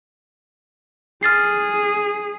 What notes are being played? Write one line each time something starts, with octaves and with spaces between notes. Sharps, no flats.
G#4 F6 A6 C7